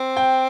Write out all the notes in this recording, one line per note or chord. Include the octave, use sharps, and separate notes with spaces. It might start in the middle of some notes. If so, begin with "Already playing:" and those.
Already playing: C4
G5